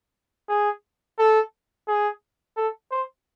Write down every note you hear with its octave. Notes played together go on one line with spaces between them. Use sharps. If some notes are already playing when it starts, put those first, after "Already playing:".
G#4
A4
G#4
A4
C5